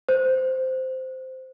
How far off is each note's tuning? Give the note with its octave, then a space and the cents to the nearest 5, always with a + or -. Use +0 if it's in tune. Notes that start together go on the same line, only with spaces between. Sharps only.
C5 -10